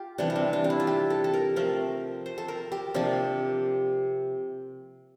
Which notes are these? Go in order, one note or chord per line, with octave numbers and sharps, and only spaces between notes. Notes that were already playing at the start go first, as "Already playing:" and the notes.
Already playing: F4 G4
C3 E3 G3 D4
D4
C4
D4
D4
E4
F4
G4
A4
A4
A#4
F3 A3 C4 A#4
C5
A4
A#4
G4
C3 F3 A#3 D4